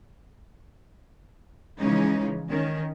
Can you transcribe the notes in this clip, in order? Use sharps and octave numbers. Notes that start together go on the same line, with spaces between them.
C#3 E3 F3 G#3 C#4 D#4
D#3 C#4